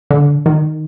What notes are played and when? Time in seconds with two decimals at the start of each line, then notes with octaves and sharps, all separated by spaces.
0.11 D3
0.46 D#3